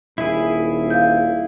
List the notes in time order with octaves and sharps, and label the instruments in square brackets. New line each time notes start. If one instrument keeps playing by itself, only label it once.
[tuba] D#1 [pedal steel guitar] E4 G#4
[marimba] F5 G6